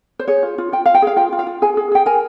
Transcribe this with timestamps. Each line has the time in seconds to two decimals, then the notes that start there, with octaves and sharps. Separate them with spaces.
0.19 C5
0.28 G#4 C#5
0.43 F4
0.58 F4
0.72 F4 G5
0.86 F4 F5
0.94 G5
1.02 G#4 F5
1.16 F4 G5
1.32 F4
1.39 F5
1.47 F4
1.62 G#4 G#5
1.77 G#4
1.91 G#4 G5
2.06 A#4 G#5